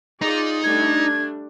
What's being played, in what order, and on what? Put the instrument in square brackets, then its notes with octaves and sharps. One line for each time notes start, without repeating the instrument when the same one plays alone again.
[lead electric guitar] D#4 [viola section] F4 G#4 D5
[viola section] G3 A3 D4 [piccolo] G#6